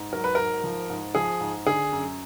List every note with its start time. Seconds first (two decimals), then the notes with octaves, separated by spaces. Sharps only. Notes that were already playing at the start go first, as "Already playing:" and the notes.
Already playing: G#2
0.12 F#3 A#4
0.24 B4
0.35 G#2 A#4
0.64 F3
0.90 G#2
1.15 F3 G#4
1.41 G#2
1.66 D3 G#4
1.92 F#2